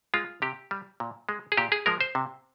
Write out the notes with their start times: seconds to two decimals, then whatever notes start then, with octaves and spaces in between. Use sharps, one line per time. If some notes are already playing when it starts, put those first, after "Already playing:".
0.14 G#3 F4
0.42 C3 G4
0.71 G3
1.00 A#2
1.29 G#3
1.52 G#4
1.57 A#2 G4
1.72 G#4
1.86 F3 G#3 A#4
2.01 C5
2.15 C3